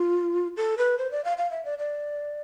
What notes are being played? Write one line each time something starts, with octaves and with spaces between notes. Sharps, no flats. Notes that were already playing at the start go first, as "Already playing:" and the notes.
Already playing: F4
A4
B4
C5
D5
F5
F5
E5
D5
D5